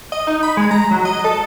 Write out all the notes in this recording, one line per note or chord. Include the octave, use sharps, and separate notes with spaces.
D#5
D#4
B5
G#3
A#5
F#3
D#5
A4